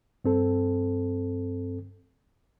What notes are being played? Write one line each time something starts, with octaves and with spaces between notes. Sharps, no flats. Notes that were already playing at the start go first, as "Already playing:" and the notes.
G2 C4 A4